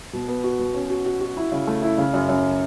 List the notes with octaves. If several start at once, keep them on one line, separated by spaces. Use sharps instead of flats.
B2
B3
F#4
B2
C#4
F#4
F#4
F#4
E4
C#3
A3
E4
C#3
F#2
F#2